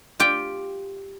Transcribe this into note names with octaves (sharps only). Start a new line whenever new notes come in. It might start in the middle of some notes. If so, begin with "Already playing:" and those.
F4 G4 G5